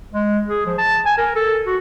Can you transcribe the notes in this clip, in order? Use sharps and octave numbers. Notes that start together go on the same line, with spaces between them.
G#3
G#4
F3
A5
G#5
A#4
A4
F#4